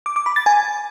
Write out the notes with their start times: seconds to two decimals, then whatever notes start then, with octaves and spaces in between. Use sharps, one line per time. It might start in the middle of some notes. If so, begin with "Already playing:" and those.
0.06 D6
0.16 D6
0.26 B5
0.36 A6
0.46 G#5